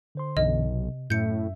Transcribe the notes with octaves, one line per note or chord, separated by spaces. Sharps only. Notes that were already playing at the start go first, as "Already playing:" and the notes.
D3 C5 C6
B1 F#2 D3 E3 D#5
C3
F#2 A2 E5 G6 C#7